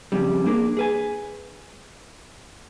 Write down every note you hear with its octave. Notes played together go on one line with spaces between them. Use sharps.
F2 C#3 G3
A#3 D4 G#4 A#4
G#4 B4 G#5